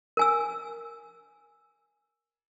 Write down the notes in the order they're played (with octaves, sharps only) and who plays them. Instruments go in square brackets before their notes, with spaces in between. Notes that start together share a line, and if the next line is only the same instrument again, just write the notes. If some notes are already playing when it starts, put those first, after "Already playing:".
[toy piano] A#4 G#5 E6